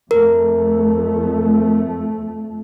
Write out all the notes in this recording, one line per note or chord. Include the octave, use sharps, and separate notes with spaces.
F2 A3 A#4